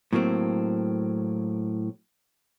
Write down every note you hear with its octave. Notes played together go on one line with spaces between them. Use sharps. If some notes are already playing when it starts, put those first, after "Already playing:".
A2 F#3 A#3 C4